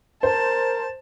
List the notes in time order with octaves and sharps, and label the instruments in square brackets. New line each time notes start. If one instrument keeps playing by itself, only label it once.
[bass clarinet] A#4 [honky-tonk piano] C5 [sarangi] A5